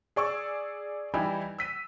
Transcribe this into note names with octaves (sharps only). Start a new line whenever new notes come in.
G#4 D5 C#6 E6
E3 G3 D#4 E4
E6 B6 D#7